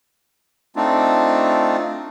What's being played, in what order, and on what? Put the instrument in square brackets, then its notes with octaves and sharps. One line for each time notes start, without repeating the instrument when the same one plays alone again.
[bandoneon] A3 C4 D4 D#4 F4